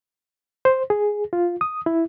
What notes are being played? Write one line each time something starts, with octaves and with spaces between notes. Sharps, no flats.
C5
G#4
F4
D#6
E4